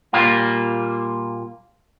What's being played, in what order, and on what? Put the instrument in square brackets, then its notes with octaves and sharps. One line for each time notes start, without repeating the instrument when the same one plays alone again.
[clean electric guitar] A#2 G3 A#3 F4